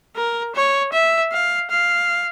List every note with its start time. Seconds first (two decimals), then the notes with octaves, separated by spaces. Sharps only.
0.16 A#4
0.55 C#5
0.93 E5
1.32 F5
1.70 F5